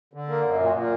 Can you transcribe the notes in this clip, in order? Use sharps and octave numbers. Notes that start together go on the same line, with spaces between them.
D3
A#3
F#2
A#2
A#2